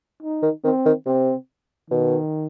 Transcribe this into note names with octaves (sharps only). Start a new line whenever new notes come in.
D#4
D#3
D#3 C4
D#3
C3 C4
B2 D#3